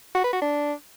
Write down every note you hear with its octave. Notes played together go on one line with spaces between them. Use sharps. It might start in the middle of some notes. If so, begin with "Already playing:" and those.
F#4
B4
F#4
D4